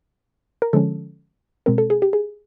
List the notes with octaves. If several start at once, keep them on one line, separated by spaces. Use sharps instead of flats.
A#4
D3 F3 G#3 C#4 A4
B2 G#3 C4 A#4
A4
G#4
G4
G#4